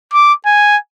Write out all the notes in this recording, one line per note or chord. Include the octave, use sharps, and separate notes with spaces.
D6
G#5